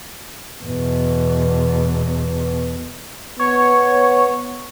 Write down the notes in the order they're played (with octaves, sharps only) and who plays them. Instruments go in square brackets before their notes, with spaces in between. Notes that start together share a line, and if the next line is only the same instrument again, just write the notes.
[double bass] E2 B2
[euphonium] B3 [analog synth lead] C#5